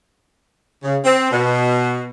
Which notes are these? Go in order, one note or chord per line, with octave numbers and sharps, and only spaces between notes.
C#3
C4
B2